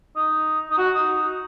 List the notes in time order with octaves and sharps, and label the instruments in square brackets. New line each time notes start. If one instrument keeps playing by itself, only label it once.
[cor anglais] D#4
D#4
F#4
D#4